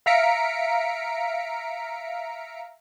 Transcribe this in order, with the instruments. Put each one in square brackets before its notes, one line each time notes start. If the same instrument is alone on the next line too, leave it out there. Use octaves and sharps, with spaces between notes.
[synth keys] E5 F5 A#5 B6 C#7 D7